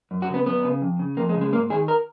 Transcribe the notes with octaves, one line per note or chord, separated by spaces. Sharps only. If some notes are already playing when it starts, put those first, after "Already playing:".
F#2
F#4
C#3 B3
F#2 B3
C#3
F2
C#3
F2 A#3
G#3
C#3
G#3
G#2 A#3
D#3 G#4
A#4